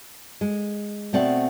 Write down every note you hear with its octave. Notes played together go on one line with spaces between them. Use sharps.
G#3
B2 A3 C4 D5 F#5